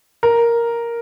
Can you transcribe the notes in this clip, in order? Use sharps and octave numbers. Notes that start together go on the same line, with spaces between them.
A#4